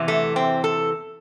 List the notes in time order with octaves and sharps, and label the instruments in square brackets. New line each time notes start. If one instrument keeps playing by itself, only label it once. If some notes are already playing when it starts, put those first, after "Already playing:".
Already playing: [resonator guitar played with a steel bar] E2 C3 E3
A3
C4
A4